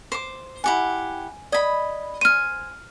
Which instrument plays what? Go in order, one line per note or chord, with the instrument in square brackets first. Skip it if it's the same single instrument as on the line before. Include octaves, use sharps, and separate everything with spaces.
[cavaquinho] C5 D6
[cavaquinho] E4 G4 F#5 [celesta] G#5
[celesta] D5 G#6 [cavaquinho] D#5 B5
[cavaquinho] C5 G#5 [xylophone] F6 D#7